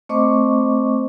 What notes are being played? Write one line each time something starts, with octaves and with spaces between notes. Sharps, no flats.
A3 C4 C5 D#5 C#6 D6